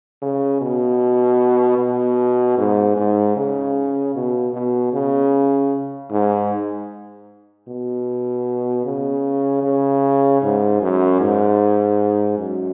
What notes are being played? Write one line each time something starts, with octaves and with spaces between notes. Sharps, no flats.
C#3
B2
B2
G#2
G#2
C#3
B2
B2
C#3
G#2
B2
C#3
C#3
G#2
F#2
G#2
F#2